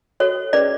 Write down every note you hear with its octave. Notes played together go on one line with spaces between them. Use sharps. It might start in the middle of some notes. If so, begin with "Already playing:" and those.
F#4 A4 C#5
C#4 G#4 B4 D5